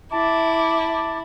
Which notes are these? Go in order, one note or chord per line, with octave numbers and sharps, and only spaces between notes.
E4 A5 D6